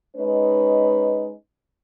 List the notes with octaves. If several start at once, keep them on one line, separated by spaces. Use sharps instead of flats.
G#3 C#4 D#4 B4